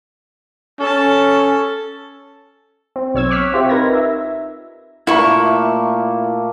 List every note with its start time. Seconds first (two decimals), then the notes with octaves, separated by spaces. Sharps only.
0.80 C#4 A4 A5
2.96 C4
3.14 B1 C#5 E6 G#6
3.31 C#6 D6 F6 F#6 B6
3.53 C4 F4 G4 E5
3.69 D#4 A#4 B4 G#6 A#6
3.93 E5
5.07 A#2 A3 A#3 E4 C#6